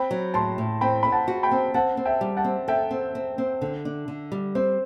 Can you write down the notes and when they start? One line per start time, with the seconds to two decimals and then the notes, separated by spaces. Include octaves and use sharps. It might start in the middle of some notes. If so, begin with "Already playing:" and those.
Already playing: C4 G5 B5
0.11 F#3
0.34 A2 A5 C6
0.58 A2
0.81 C4 G5 B5
1.03 C4 B5
1.12 F#5 A5
1.28 F#4
1.43 G5 B5
1.51 C4
1.74 C4 F#5 A5
1.97 C4
2.05 E5 G5
2.21 G3
2.37 F#5 A5
2.45 C4
2.68 A4 E5 G5
2.91 C4
3.15 C4
3.38 C4
3.62 D3
3.85 D4
4.08 D3
4.32 G3
4.55 C4 C5